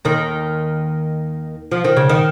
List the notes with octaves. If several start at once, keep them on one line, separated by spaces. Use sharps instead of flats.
D#2 D#3
F3
D#3
C#3
D#3